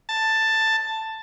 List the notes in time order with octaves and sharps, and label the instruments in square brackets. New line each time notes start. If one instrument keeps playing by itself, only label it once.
[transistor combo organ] A5